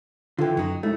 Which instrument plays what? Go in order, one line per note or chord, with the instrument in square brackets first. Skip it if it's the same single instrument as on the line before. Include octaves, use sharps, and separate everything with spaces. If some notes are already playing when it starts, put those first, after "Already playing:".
[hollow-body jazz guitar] D3 E3 [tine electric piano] F4 A4 G5
[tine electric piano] F#2 [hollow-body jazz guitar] F#3 D#4
[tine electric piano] G#3 D#4 E4 [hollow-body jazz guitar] A3